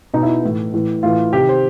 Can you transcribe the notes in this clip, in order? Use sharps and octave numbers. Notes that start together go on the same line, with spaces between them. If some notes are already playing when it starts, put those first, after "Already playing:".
B2 D#4
E4
A2 E3
A2 E3
A2 E3 F4
C3 D#3 G4
C5